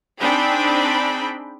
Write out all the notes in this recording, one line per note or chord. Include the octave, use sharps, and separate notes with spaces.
C4 D4 D#4 G#4 G5 B5